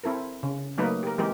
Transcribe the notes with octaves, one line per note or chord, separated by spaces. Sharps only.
C4 E4 A4 A#4
C#3
F#3 A3 A#3 D#4 A#4 B4
G4 A#4
E3 G#3 C4 G4 A#4